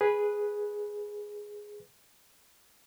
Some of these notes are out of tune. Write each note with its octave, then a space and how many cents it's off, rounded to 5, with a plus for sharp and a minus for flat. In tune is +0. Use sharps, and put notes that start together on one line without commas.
G#4 +0 B4 -10